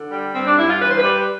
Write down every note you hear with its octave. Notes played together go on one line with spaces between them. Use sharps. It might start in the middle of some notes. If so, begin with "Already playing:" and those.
Already playing: D3
G3
G2 C4
D4
G2 E4
F4
E3 B4
C5
B4
G3